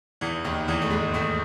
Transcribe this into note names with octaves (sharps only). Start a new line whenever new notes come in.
E2 E3
D#2 D#3
E2 E3
A3
G#2 G#3
A2 A3